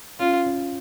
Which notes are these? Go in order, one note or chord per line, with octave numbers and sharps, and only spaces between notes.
C#4 F4
C#4